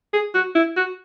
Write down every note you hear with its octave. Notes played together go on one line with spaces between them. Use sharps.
G#4
F#4
E4
F#4